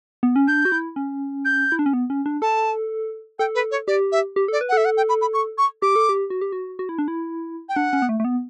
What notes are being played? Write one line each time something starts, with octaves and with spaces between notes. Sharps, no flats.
B3
C#4
D4 G6
F#4
E4
C#4
G6
E4
D4
C#4
B3
C#4
D4
A4 A5
A4 G5
B4
C#5
G4 D5
E5
G4
A4
D5
B4
F#5
A4 E5
F#5
G5
B5
B5
C#6
C#6
G4 D6
A4
G4
F#4
G4
F#4
F#4
E4
D4
E4
G5
D4 F#5
C#4
B3
A3
A3
B3